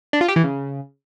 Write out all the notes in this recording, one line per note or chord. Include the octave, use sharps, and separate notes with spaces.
D4
F4
G4
E3
C#3